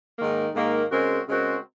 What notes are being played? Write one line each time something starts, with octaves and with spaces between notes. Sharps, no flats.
G#2 D#3 A#3
G#2 D#3 A#3
C#3 G#3 C4 F#4 A#4
C#3 G#3 C4 F#4 A#4